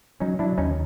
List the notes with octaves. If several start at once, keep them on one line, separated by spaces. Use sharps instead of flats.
F#3 C#4 D#4
F#3 D4 E4
D#2 C#4 D#4